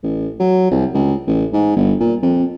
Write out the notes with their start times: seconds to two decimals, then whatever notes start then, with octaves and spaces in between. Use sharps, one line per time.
0.03 A1
0.40 F#3
0.71 C2
0.94 C#2
1.27 A1
1.53 G#2
1.76 G1
2.00 A#2
2.23 F2